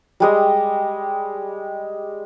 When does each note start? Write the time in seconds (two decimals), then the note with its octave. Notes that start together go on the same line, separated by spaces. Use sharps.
0.20 G3 G#3 D#5